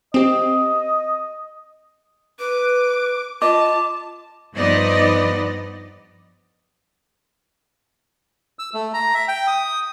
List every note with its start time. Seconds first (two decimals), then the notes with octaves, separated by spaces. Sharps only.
0.14 C4 G4 D#5
2.39 B4 D6
3.42 F4 D#5 A5 D6
4.54 G2 F3 B3 D#4 D5 D#5
8.59 E6
8.74 A3
8.94 A#5
9.14 E5
9.28 G5
9.47 D#6